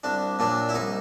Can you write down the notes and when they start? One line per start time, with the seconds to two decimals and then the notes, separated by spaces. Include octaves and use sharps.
0.04 C2 D4
0.39 A#2 F#3 D4
0.69 E4
0.74 C2 D#4